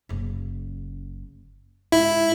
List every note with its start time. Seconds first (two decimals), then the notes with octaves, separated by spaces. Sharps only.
0.09 F#1 C#3
1.92 G#2 E4